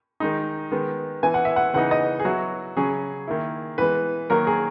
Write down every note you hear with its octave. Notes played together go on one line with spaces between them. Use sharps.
D#3 G#3 D#4
D#3 G#3 B3
E3 B3 E4 G#5
F#5
E5
F#5
C#3 E3 B3 D#4 F#5
D#5
G#4
F#3 B3 E4 F#4
C#3 F#3 C#4 G#4
D#3 A#3 E4
E3 G#3 B3 B4
D#3 F#3 A#3 A#4
G#4